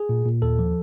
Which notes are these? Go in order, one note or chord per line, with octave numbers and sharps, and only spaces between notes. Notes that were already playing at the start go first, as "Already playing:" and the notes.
Already playing: G#4
A#2
A#2
D#2 A4
F3